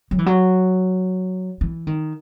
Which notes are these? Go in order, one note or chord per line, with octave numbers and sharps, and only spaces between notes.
F#3
E3
F#3
E3
D#3